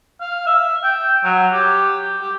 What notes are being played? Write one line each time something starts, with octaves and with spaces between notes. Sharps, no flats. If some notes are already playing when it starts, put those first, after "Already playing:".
F5
E5
G5
F#3
G4
G4